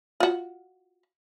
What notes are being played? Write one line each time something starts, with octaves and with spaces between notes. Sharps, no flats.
F4 F#4